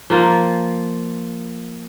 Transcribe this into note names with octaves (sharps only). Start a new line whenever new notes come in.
F3 A#3 F4